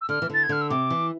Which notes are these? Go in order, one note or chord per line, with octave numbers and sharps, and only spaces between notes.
E6
D3 F6
E3
D3 A6
G#6
D3 F6
E6
C3 D6
E3